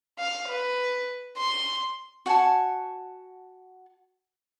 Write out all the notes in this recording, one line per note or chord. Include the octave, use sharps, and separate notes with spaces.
F5
B4
C6
F#4 F#5 G#5 A5